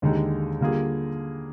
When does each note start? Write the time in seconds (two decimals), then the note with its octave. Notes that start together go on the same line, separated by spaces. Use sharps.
0.02 D#2 D3 G#3 D#4 G4
0.61 D3 G3 A#3 F4 G#4